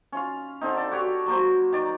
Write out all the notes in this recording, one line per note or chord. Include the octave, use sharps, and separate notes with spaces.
C#4 F4 F5
D3 C4 D#4
A4 D5
F#4 G4 C#5
F#3 A#3 C5
D#3 D5